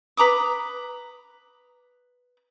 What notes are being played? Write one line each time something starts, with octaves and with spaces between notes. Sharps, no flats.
B4 A#5 D6 D#6